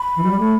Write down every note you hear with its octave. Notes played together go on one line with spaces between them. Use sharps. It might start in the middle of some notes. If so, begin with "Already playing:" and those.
Already playing: B5
E3
F#3
G3
A3